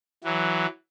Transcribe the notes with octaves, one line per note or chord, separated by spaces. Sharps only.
E3 F#3